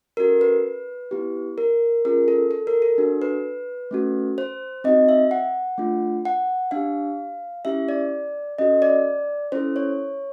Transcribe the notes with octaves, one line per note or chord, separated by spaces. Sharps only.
C#4 F#4 A4 A#4
B4
B3 E4 G4
A#4
C#4 F4 G#4 A#4
A4
A4
A#4
A4
D4 F#4 A4
B4
A3 C#4 F#4 A4
C5
C4 D#4 F#4 D#5
E5
F#5
A3 D4 F4
F#5
D4 G4 F5
C#4 E4 G4 E5
D5
C#4 F#4 A4 D#5
D5
C#4 E4 A4 C5
C#5